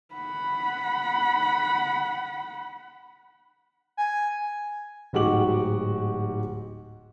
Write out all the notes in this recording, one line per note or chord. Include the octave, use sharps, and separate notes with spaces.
F#5 B5
G#5
D1 G#2 F#4 G4 D6 F#7